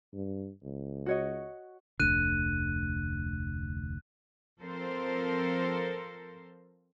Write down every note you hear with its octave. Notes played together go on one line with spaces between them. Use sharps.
G2
C#2
F#4 C#5 D#5
F1 D2 D3 F#6 D#7
F3 C4 A4 A#4 C5